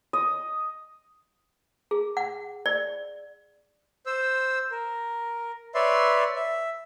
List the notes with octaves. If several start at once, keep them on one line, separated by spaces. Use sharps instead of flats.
D#5
G#4
F#5
D5
C5 E6
A#4
B4 C#5 D5 E5 C6
E5